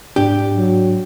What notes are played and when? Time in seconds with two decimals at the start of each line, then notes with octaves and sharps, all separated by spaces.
0.16 G#2 D4 G4
0.55 F#3